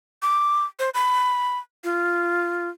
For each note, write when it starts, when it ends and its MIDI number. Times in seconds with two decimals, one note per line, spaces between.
0.22 0.65 86
0.79 0.90 72
0.94 1.59 83
1.84 2.68 65